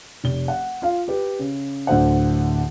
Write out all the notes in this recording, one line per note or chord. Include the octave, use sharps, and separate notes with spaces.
F1 G7
F#5
F4 F5
G4 B4
C#3
D1 D2 D3 C5 F#5